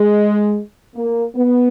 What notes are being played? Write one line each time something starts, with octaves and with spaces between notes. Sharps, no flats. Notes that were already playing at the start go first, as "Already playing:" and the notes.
Already playing: G#3
A#3
B3